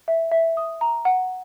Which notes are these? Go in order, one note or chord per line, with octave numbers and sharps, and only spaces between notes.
E5
E5
D#6
A#5
F#5